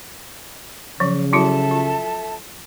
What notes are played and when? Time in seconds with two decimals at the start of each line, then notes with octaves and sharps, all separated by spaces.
1.00 C#3 F3 F#3
1.33 F#3 E4 F#4 A4 E5 A5
1.71 F4